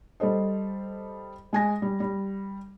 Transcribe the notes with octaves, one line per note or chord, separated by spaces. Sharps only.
G3 A4 C5 D#5
G#3 G#5 A#6
G3
G3